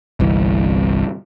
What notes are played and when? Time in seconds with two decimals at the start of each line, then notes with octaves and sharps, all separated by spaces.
0.20 G1 C2 E3